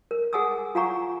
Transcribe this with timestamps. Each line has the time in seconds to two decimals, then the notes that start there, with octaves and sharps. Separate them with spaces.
0.11 A#4
0.33 G#4 F#5 G#5 D#6 E6
0.75 F4 F5 F#5 G#5 A#5 C#6